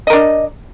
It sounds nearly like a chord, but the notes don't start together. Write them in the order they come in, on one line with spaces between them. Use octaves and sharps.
D#5 A#4 D4